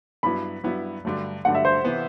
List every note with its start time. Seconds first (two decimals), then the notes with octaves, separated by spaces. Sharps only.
0.23 G2 F#3 B3 E4 B5
0.64 G2 F#3 B3 E4
1.05 G2 D3 F#3 A3
1.45 G2 D3 F#3 A3 F#5
1.55 E5
1.65 C5
1.85 C3 E3 B3